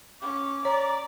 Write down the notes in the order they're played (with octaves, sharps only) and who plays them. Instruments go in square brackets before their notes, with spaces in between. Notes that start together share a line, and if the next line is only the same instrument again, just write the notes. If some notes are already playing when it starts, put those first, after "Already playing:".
[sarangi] C#4 [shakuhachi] D6
[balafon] C#5 [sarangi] D5 [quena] A#5